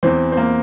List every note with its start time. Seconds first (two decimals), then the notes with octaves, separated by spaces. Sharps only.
0.03 E2 E3 C4
0.32 C4
0.37 A#3